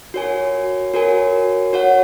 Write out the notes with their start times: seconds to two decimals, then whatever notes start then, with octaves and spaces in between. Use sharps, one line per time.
0.14 F#4 A#4 C#5 G#5
0.94 F#4 A#4 C#5 G#5
1.73 F#4 C#5 F#5